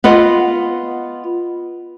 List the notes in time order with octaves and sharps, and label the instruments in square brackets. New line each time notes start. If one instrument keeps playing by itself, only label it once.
[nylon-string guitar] B3 F4 D#5 F#5